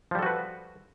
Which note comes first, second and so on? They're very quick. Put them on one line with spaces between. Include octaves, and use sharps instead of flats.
F3 G3 A4 F#4 B4